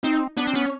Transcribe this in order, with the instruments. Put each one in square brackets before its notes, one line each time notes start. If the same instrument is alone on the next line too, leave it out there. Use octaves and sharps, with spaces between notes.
[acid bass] C4 [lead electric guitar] D#4
[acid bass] B3 [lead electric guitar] D4
[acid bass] C4
[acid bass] B3 [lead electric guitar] C#4